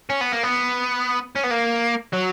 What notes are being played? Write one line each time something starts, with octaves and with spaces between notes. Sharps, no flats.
C#4
B3
A#3
B3
C#4
B3
A#3
F#3